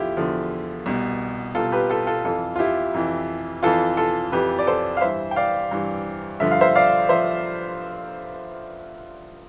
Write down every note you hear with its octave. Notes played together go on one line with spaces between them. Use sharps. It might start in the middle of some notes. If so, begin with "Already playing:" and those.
Already playing: E2 D3 F3 E4 F4 G4
E2 D3 F3
C2 B2
C2 B2 F4 A4
G4 B4
F4 A4
F4 A4
F2 E3 F4 A4
F4
E4 G4
F2 E3
F2 E3 F4 A4
F4 A4
F2 E3 G4 B4
D5
A4 C5
F5
G2 E3 C5 E5
G5
D5 F5
G2 E3
G2 D3 F3 E5
F5
C5 E5
D5 F5
F3 C5 E5